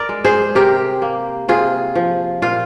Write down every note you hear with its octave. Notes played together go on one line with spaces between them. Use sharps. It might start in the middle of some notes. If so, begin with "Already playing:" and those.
Already playing: A#4 D5
G#3
G#4 C5
C3 G4 A#4
A#3
C3 F4 G#4
F3
A#2 F4